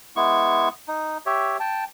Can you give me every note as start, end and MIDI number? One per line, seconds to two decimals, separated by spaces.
0.16 0.69 56
0.16 0.69 59
0.16 0.69 64
0.16 0.69 85
0.88 1.18 63
1.26 1.57 67
1.26 1.57 73
1.26 1.57 76
1.60 1.84 79
1.60 1.84 81